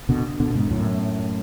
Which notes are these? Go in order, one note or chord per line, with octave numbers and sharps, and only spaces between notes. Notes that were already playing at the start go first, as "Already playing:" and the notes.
B2 D3
B2 D3
G#2 B2
F#2 A2